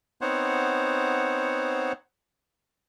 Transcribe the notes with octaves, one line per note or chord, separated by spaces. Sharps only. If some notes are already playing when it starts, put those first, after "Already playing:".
B3 C4 D#4 C5 C#5 F#5